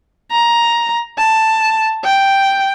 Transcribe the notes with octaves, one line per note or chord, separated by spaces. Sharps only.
A#5
A5
G5